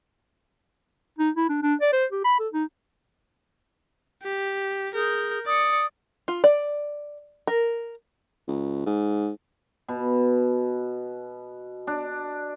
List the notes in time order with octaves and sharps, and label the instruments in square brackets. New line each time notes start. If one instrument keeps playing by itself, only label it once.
[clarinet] D#4
E4
D4
D4
D5
C5
G4
B5
A4
D#4
[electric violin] G4
[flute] G#4 [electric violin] A#4 G6
[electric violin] D5 C#7 [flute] D#6
[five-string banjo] F4
D5
A#4
[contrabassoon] C#2
G#2
[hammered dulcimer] B2
D4